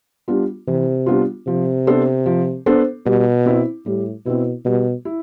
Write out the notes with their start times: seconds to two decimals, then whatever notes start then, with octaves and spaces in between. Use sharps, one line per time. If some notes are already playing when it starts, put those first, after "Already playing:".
0.28 G3 B3 D4 F4
0.67 C3 E3
1.06 G3 B3 D4 F4
1.47 C3 F3
1.87 B3 D4 A4 C5
2.26 F3
2.66 B3 D4 A4 C5
3.05 B2 G3
3.46 C4 E4
3.85 A2 G3
4.26 B2 C4 E4
4.65 B2 G3
5.05 E4